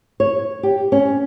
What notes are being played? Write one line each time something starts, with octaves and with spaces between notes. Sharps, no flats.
C#5
G4
C#4